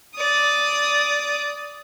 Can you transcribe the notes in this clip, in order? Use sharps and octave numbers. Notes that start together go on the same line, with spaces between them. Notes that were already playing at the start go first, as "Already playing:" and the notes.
D5 D#6